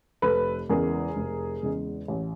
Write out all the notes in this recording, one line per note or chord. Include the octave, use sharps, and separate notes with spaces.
F1 A4 B4
E2 C#3 E3 G#3 G#4 A#4
F1
E2 C#3 E3 G#3
A1